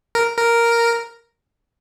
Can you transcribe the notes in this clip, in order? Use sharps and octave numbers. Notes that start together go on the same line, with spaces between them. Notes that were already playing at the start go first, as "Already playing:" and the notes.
A#4
A#4